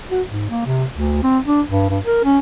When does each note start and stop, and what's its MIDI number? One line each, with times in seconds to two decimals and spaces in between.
0.11 0.22 66
0.29 0.50 44
0.50 0.66 58
0.66 0.84 48
0.94 1.20 38
1.23 1.39 60
1.46 1.62 62
1.69 1.88 43
1.90 1.99 43
2.05 2.23 70
2.24 2.39 61